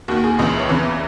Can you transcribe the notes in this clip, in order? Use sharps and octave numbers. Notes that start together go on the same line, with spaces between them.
D#2 D#3 F#4
G#4
C#2 C#3 E3 D#5
C#5
E2 C#3 E3 B4